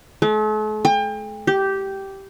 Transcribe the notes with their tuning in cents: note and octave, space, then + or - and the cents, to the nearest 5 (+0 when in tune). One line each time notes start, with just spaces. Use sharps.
A3 -45
G5 +35
G4 -10